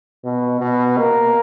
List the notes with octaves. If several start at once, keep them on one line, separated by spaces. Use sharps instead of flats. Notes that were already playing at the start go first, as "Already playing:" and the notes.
B2
B2
A#3